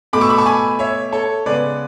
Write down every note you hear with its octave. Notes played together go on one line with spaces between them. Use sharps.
B2 A3 B5 D6
C#6 E6
B5 D6
A5 C#6
G#5 B5
C#5 E5
A4 C#5
C#3 G#3 B3 B4 D5